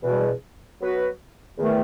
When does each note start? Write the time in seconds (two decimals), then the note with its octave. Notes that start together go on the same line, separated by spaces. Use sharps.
0.02 E2 B2 G3
0.80 F#3 B3 F#4 B4
1.57 E2 D#3 A3